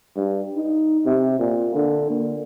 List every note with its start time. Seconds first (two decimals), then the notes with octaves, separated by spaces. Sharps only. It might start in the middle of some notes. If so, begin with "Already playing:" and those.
0.16 G2
0.56 D#4
1.06 C3
1.39 A#2
1.74 D3
2.10 A#3